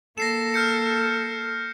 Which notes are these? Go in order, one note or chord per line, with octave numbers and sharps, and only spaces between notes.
A#3 A4 A#6 C7 E7
F6 G6 C#7